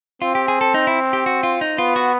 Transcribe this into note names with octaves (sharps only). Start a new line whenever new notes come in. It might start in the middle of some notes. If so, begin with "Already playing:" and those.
C4 F4
G4
G#4
A4
D#4
E4
G4
F#4
F4
D#4
B3 F4
F#4